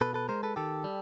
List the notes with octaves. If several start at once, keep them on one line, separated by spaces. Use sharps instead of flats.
B2 A4 B4
A4 B4
G#3 A#4 C5
A4 B4
D#3 G4 A4
G3